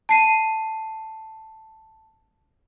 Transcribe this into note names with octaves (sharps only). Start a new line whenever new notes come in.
A5 C7 D#7